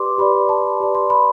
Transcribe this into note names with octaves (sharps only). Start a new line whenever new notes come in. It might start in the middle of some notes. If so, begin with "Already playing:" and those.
Already playing: G4 B4 D5 C6 D6
G4 B4 D5 B5
A5
G4 B4 D5
C6
B5